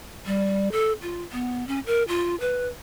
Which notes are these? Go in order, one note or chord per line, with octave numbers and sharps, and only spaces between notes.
G3
A4
F4
B3
C#4
A#4
F4
B4